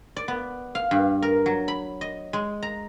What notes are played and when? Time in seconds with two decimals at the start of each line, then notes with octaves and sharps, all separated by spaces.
0.16 D5
0.28 B3
0.75 F5
0.91 G2
1.22 A#4
1.46 F#3
1.68 B5
2.01 D#5
2.33 G#3
2.63 A#5